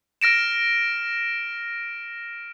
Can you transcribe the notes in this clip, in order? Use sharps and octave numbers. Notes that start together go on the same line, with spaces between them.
F6 A#6 D7 E7